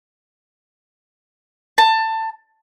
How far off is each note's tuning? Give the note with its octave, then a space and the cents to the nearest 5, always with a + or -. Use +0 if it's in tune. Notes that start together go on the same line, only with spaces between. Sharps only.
A5 +20